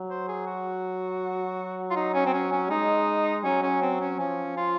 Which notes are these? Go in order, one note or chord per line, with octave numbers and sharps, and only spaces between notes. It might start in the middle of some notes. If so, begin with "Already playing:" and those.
Already playing: F#3
C5
G#4
F#4
F4
D#4
C#4
C4
C#4
C#4
G#3 D#4
F#3 C#4
C#4
C4
C#4
F3 C#4
F4